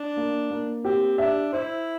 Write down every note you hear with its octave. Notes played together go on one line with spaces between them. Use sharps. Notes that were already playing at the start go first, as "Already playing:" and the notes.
Already playing: D4
A#3
A#3
C4 G4
D4 E5
E4 C5